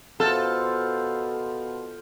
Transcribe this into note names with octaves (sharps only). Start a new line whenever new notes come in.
B2 F4 A4 C5